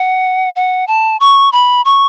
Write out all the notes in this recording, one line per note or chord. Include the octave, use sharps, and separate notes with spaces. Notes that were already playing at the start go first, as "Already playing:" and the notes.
Already playing: F#5
F#5
A5
C#6
B5
C#6